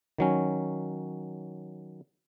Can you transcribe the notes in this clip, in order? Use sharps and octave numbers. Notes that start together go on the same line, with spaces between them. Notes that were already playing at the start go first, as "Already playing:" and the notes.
D#3 F#3 C#4